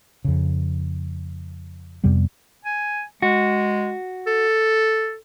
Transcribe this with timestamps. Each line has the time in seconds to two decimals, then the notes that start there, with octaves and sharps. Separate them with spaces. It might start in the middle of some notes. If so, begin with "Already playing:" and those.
0.25 F2 C#3
2.04 F2 C3 G3 B3
2.65 G#5
3.22 G#3 F#4
4.27 A4